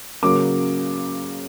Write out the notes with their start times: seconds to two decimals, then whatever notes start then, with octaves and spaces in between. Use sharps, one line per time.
0.23 C#3 F#3 A#3 D6